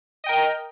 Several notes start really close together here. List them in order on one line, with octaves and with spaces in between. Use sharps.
D#5 G5 A#4